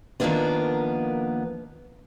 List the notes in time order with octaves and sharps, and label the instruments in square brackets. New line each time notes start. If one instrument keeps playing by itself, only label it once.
[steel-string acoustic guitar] D#3 F3 F#3 A#3 B3 D4